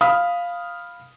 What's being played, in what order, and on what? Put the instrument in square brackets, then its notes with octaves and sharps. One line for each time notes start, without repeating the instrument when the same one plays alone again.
[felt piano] F5 B5 D#6 F6